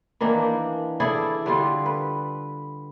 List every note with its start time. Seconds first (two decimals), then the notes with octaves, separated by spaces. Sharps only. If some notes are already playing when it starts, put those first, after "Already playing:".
0.21 D#3 E3 A#3 D4
1.00 E4 G#4 A4 D5
1.46 D3 G3 F4
1.86 B4